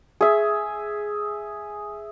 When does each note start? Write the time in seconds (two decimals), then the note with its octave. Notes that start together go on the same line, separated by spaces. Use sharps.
0.21 G#4 E5